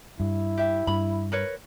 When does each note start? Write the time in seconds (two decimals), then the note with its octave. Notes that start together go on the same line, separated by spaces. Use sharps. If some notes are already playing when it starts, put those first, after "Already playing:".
0.20 G2 E4
0.57 G4 E5
0.87 G2 B5
1.32 A#4 B4 C#5